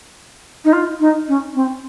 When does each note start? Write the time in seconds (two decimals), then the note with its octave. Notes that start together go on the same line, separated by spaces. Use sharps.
0.64 D#4
0.73 F4
1.00 D#4
1.28 C#4
1.55 C4